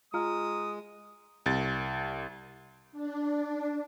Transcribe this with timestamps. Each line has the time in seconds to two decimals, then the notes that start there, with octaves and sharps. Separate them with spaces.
0.14 G#3 F4 A#5 D#6 F6
1.46 C2 A6
2.92 D4